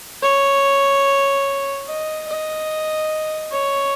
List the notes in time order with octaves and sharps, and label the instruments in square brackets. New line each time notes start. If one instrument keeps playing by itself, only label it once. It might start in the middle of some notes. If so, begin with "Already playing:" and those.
[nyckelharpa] C#5
D#5
D#5
C#5